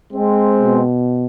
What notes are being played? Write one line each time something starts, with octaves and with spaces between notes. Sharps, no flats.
G#3 C4
B2